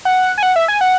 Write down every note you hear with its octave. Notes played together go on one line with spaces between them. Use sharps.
F#5
G#5
F#5
E5
G#5
F#5